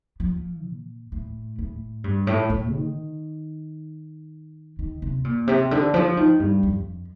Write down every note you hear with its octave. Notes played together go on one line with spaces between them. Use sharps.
F3
A#2
A2
A2
G2
A2
A2
D#3
D#3
C3
A#2
C3
D3
F3
D#3
G2
F2